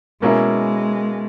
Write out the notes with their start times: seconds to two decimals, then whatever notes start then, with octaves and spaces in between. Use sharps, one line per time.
0.22 B2 G#3 A#3 C#4 E4 A#4